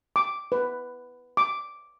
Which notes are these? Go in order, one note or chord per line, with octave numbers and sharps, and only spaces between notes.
D6
B4
D6